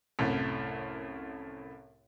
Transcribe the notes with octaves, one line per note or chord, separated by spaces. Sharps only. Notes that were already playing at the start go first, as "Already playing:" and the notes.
C2 F#2 A2